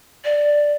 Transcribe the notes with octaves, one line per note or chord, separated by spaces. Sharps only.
D5